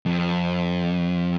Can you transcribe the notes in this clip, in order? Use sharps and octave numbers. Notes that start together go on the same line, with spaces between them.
F2